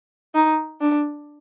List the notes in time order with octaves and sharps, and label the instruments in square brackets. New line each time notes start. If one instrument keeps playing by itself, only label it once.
[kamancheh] D#4
D4